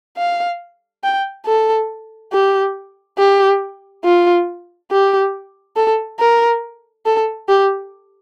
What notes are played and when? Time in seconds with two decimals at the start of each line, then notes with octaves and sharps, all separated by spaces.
0.18 F5
1.04 G5
1.47 A4
2.33 G4
3.18 G4
4.05 F4
4.91 G4
5.76 A4
6.20 A#4
7.06 A4
7.49 G4